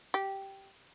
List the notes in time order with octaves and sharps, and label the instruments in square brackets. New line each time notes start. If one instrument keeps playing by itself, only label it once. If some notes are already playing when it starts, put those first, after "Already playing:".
[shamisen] G4